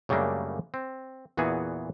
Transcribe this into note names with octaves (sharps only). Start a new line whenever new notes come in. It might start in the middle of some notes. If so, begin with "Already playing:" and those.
F#2 C#3 G3 A3 A#3 D4
C4
E2 A#2 E3 B3 F#4 G#4